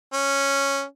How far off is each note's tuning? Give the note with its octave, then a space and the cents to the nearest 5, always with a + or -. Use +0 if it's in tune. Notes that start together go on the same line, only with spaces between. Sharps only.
C#4 -5